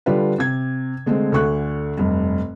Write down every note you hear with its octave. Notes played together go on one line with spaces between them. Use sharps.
D3 G3 D4 F4 B4
C3 G#6
D3 G#3 A3 C4
D2 D3 C#6 F#6
F1 G2